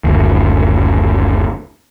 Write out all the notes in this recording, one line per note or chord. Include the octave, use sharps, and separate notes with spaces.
F#1 D2